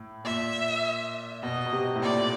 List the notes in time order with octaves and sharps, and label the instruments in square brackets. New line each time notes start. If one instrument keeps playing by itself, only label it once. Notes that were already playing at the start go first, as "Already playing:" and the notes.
Already playing: [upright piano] A2
[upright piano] A#2 [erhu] E5
[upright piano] B2 [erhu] D#5
[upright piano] B2
C3
A2
[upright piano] A#2 [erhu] D5